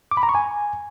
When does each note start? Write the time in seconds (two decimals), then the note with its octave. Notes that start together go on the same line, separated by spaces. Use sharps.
0.11 D6
0.17 B5
0.23 A#5
0.29 C#6
0.35 G#5